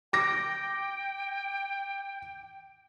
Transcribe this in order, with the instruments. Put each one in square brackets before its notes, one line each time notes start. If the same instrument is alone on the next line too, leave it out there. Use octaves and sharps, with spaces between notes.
[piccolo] G5 [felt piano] D6 A#6